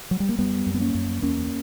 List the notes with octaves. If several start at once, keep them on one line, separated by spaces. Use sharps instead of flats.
F#3
G3
A#3
F#2 G3 B3
F#2
B3
A#3 C#4
F#2
E2 A#3 C#4